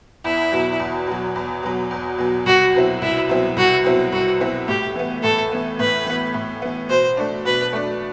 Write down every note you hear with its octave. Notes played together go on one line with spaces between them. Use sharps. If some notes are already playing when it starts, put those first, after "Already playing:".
E2 E4
B2 F#3
E2
B2 F#3
E2
B2 F#3
E2
B2 F#3
C2 F#4
B2 F#3 C4 E4
C2 E4
B2 F#3 C4 E4
C2 F#4
B2 F#3 C4 E4
C2 F#4
B2 F#3 C4 E4
A2 G4
E3 B3
A2 A4
E3 B3
A2 B4
E3 B3
A2
E3 B3
B2 C5
A3 D4
B2 B4
A3 D4